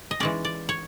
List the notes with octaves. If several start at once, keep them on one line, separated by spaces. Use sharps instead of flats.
D#5
E3 G#3 C#4 D5
D5
C#5